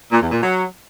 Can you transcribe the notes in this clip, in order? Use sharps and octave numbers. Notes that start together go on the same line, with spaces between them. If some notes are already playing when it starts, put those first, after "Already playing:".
A#2
E2
A#2
F#3